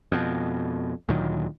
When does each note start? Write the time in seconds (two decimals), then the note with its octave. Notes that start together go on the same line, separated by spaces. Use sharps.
0.12 F2 B2
1.08 D2 A#2 D#3 F#3